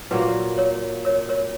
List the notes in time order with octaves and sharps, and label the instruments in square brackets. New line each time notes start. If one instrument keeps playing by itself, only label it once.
[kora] A#2 F#3 A#3 [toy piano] B4
[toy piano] A#4 C#5
A#4 C#5
A#4 C#5